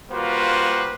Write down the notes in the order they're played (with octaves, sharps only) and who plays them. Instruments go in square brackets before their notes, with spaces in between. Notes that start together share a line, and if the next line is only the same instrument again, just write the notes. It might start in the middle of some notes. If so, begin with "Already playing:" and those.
[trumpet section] G3 A#3 F4 F#4 B4 C5